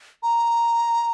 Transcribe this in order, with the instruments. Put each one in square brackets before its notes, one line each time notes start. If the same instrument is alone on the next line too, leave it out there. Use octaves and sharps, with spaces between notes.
[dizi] A#5